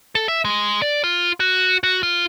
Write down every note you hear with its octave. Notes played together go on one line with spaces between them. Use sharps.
A4
E5
G#3
D5
F4
F#4
F#4
F4